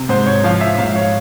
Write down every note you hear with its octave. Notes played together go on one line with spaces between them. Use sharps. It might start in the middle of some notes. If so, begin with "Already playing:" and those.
Already playing: C3
G#2 C5
C#5
F3 F5
E5
G#2 F5
C#5